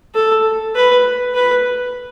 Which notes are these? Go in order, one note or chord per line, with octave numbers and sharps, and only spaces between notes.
A4
B4
B4